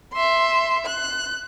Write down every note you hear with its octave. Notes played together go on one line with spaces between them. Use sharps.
E5 C6
F#6